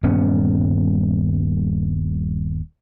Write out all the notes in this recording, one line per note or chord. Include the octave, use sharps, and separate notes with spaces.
D#1 G2 B3 C#4